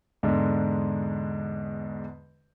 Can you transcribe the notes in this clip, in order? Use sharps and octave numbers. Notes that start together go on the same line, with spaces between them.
E2 G#2 D3 G#3 D4